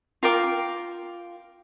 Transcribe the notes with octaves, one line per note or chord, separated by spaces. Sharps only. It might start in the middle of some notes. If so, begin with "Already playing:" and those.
F4 A#4 G5 D6